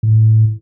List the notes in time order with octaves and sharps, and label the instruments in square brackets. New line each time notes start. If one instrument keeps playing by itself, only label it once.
[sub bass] A2